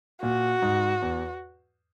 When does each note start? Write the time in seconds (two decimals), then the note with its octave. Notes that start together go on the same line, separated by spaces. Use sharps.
0.22 A#2 F#4
0.62 G#2
1.02 E2